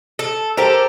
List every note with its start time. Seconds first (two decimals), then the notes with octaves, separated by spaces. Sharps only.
0.19 A4
0.57 G4 A4 A#4 C5